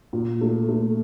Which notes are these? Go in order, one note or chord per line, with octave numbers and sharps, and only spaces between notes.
A#2
A3
A3